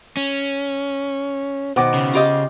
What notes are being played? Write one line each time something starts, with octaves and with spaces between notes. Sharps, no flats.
C#4
B2 D#3 C5 F#5 D6
C#3
F4 G4 D#5